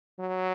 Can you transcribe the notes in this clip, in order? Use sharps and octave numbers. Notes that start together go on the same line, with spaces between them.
F#3